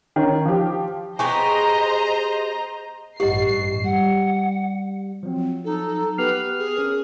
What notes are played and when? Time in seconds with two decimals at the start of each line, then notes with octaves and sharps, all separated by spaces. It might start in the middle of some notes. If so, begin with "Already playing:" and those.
0.16 D#3 C#4
0.45 F3 G4
1.19 B3 G4 G#4 C5 D#5 G#5 A#5 C#6
3.20 A1 G2 F#4 G4 D#5 C7
3.84 G3 F#5
5.23 F3 F#3 C4
5.65 D#4 A4
6.18 B3 G4 B4 F6 C7
6.59 G#4
6.77 C#4 A#4